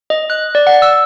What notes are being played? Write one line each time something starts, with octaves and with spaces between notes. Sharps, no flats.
D#5
F#6
D5
F#5
E6